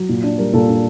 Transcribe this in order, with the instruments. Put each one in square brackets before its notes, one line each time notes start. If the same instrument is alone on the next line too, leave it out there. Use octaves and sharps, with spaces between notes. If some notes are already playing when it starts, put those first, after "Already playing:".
Already playing: [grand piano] F#3
A#2
D4
G3 A#4
A#2 A4
D4